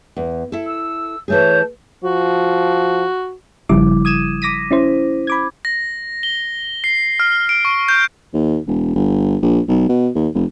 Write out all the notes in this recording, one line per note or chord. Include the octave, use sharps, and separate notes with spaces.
E2
E4 A4
E6
E3 A3 G#4 C#5 A5 G6
F3 F#4
G1 C#3 F3 G3 E4 D6
D#6 G#6 D#7 E7
D6 A#6 B6 D#7
C#4 E4 C5
B5 D6 G#6
A#6
G7
C7
F6
D7
C#6
G6
D#2
E1
G1
A#1
B1
B2
D#2
F1